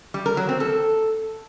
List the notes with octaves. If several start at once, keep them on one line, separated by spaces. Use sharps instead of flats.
G3
A#4
F#3
C4
A4